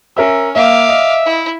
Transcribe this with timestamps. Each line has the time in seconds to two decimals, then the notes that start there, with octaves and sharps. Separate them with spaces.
0.17 C#4 A#4 E5 E6
0.56 A#3 E5 F5 D6
0.89 D#5
1.25 E4